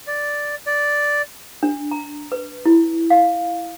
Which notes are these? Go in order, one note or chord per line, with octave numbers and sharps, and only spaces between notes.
D5
D5
D4
A#5
B4
E4
F5